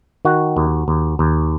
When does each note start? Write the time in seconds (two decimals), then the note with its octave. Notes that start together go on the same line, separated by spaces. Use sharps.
0.25 D#3 F#4
0.57 D#2
0.88 D#2
1.19 D#2